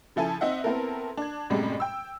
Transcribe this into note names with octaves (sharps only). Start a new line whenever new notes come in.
C#3 F3 E4 A4 G#5
C4 D#4 E5 F#5
B3 C4 E4 A4 A#4
D4 G#6
F#2 A2 C3 G3 G#3
G5 E6